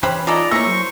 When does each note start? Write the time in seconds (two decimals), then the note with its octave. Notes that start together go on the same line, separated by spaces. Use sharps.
0.03 E3 C#4 G4 B4 C5 B5
0.27 G#3 D#4 F4 A4 D5 D#5 A#5
0.51 A3 A#3 E4 G#4 C#5 A#5 C#6 E6
0.66 F#3 C5